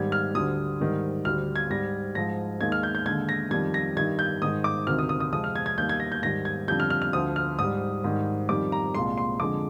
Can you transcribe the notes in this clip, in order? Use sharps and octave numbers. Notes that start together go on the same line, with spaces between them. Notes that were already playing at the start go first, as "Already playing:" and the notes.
Already playing: G#2 D#3 G3 G#6
F6
D2 D3 G3 D#6
G#2 D#3 G3
D2 D3 G3 F6
G#6
G#2 G3 A#6
G#2 F3 G#3 A#6
D#2 D#3 G#3 G#6
F6
G6
G6
D#2 D3 G#3 G#6
A#6
F2 D#3 G3 G#6
A#6
G2 D#3 G3 G#6
G6
G#2 D#3 G#3 D#6
D6
D2 C3 D#3 F6
D#6
D#6
D#6
F2 C3 F3 G#3 D#6
F6
G#6
G#6
D#2 D#3 G3 G6
G#6
A#6
G6
G#2 D#3 G3 A#6
G#6
F2 D3 G3 G6
F6
F6
F6
D2 D3 F3 D#6
F6
G#2 G3 D#6
G#2 D#3 G3
F2 D#3 G3 D6
A#5
C2 A#2 G#3 C6
C6
F2 D3 G#3 D6